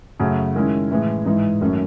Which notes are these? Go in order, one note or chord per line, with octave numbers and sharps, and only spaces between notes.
F#2 C#3 F#3 A3 C#4
D#3 G#3 C#4 E4
A2 E3 G#3
G#2 E3 G#3 D#4
F#2 D#3 A3 C#4